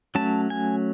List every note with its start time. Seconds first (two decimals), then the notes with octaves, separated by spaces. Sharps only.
0.15 F#3 A3 C#4 A5
0.50 G#5